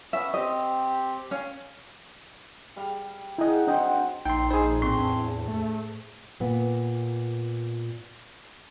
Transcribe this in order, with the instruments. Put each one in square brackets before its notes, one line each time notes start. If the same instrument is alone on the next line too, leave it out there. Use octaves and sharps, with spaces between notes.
[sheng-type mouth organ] B3 C#4 [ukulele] E5
[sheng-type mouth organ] C4 G4 [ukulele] D#5
[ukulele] C#4 [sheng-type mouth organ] F5
[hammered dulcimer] G3 F5
[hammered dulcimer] D#4 G#4 F#5 [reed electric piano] E4 D#5
[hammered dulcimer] F#3 C4 [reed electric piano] D4 D#5 G5
[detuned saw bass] A#1 [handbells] D#4 [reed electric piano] G5 C6
[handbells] D#4 [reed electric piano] G#4 C5 [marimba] D#5 B5
[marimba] A2 [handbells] C4 C6
[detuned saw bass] E2 [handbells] D4
[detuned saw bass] A3
[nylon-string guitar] A#2 B3